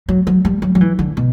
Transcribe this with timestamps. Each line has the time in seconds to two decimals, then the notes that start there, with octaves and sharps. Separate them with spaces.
0.09 F#3
0.27 F#3
0.45 G3
0.62 F#3
0.75 F#3
0.81 E3
0.99 D3
1.17 B2